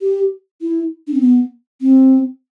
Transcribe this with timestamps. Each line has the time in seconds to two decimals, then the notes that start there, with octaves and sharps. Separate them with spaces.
0.01 G4
0.61 E4
1.07 D4
1.13 C4
1.20 B3
1.81 C4